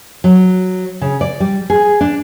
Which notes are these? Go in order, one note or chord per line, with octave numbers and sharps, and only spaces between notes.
F#3
C#3
D5
G3
G#4
D4